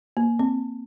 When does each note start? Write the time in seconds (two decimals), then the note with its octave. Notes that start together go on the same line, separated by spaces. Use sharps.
0.17 A#3
0.39 C4